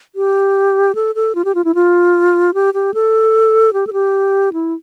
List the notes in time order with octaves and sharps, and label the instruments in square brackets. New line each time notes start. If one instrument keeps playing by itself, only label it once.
[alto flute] G4
A4
A4
F4
G4
F4
E4
F4
G4
G4
A4
G4
A4
G4
E4